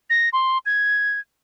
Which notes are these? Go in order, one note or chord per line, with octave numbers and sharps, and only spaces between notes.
A#6
C6
G#6